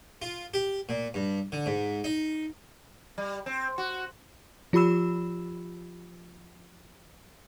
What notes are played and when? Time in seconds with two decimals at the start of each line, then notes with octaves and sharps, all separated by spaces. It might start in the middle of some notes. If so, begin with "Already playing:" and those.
0.22 F4
0.54 G4
0.89 A#2
1.14 G2
1.52 D3
1.66 G#2
2.04 D#4
3.18 G3
3.46 C4
3.78 F#4
4.73 F3 F4 G4 B5 E6 E7